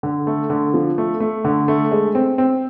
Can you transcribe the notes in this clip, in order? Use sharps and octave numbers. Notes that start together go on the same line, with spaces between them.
D3
A3
D3
F3
A3
A3
D3
A3
G#3
C4
C4